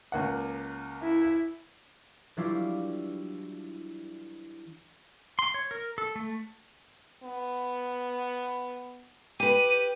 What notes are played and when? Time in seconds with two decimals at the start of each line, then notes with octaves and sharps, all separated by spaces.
0.12 C#2 A#3 F#5
1.02 E4
2.37 E3 F#3 G3 D4 E4 F4
5.39 C6
5.54 C#5
5.71 A#4
5.98 A4
6.16 A3
7.23 B3
9.40 G4 B4 D#7